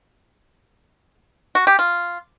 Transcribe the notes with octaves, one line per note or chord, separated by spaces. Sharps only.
F#4
G4
F4